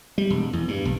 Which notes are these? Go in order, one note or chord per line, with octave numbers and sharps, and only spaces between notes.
G3
E1
E2
G2
B1